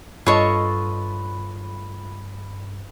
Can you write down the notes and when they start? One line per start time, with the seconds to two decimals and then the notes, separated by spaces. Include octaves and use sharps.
0.26 G2 F4 A4 B4 C#5 D#5 C#6